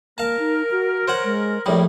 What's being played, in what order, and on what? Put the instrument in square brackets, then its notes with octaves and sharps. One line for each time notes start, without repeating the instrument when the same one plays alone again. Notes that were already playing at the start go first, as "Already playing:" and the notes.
[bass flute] A#3 [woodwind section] A#4 [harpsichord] F5 A5
[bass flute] D#4
F#4
[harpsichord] C5 C#5 F#5
[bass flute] G#3
[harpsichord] A#1 A2 G3 [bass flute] C#5